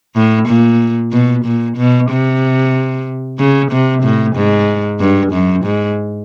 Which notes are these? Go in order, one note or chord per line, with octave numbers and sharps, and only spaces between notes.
A2
A#2
B2
A#2
B2
C3
C#3
C3
A2
G#2
G2
F#2
G#2